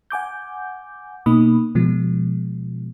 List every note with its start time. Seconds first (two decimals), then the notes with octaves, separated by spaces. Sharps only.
0.10 F#5 G#5 D6 G6
1.26 B2 A#3 D#4 B5 D#6
1.75 B2 F3 G#3